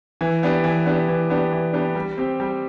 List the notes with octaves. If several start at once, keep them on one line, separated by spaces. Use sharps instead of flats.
E3
B3 D4 G4
E3
B3 D4 G4
E3
B3 D4 G4
E3
B3 D4 G4
G3
C4 G4
G3